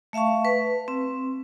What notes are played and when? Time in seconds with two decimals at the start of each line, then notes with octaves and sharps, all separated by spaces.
0.13 A3 E5 F5 A5 C#6
0.45 B4
0.88 C4